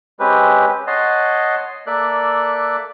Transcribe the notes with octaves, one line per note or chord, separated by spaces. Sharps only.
G#3 C4 C#4 G4 B4
C#5 D#5 F#5 A5 C6
A#3 A4 D5 E5 F#6